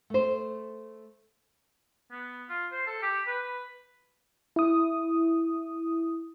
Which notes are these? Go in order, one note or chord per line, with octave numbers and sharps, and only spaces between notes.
A3 C5
B3
F4
C5
A4
G4
B4
E4 D#6